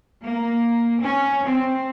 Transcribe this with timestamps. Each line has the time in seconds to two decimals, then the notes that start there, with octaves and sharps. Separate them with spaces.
0.25 A#3
1.02 C#4
1.46 C4